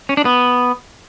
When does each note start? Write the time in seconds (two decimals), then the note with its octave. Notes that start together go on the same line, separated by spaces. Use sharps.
0.09 C#4
0.17 D4
0.25 B3